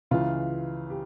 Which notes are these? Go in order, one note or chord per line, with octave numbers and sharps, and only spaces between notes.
C#2 C#3 E3 F4
G4